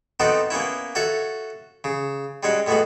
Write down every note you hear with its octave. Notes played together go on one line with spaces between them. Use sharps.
B3 C4 D#4 F#4 A4 G5
A#3 B3 C#4 E4
F#4 A4 C#5 E5 F5
C#3
G3 G#3 C#4 F#4
A2 G#3 A3 B3 F#4